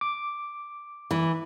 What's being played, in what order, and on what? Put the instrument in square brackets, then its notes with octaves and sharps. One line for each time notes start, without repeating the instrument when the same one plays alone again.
[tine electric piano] D6
[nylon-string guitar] E3